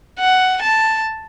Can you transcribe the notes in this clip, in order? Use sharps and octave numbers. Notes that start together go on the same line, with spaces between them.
F#5
A5